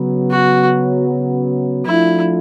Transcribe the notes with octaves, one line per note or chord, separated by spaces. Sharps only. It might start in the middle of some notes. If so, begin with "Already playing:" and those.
Already playing: C#3 F#3 B3
F#4
F3 A3 D4 E4 F4